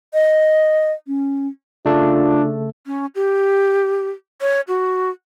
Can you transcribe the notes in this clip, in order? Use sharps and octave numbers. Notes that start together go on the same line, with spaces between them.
D#5
C#4
C#3 A3 D4 F4 A4
C#4
G4
C#5
F#4